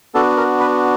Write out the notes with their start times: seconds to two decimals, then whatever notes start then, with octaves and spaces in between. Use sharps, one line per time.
0.14 B3 D4 F#4 A4
0.37 A#4
0.60 B4